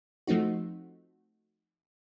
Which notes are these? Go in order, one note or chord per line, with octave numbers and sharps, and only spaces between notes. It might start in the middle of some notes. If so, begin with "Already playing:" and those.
F3 A3 C4 D#4 F#4